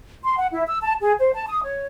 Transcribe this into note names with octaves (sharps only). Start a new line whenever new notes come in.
C6
F#5
E4
E6
A5
G#4
C5
A5
D#6
C#5